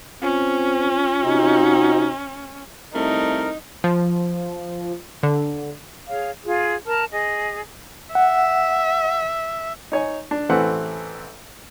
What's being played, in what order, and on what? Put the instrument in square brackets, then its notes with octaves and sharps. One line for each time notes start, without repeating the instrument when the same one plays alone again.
[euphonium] C4 [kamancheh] C#4 [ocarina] F4
[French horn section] C3 D#4 [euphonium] F#4
[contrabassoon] C2 [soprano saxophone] A3 [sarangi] D#4 [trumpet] A#4
[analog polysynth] F3
D3
[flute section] G#4 C#5 F5
F4 G#4
A#4 A5 F6
G#4 D#5
[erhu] E5 [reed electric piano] F#5
[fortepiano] D#4 C#5 G#5
D4
A1 E3 A3 C4 B4 F#5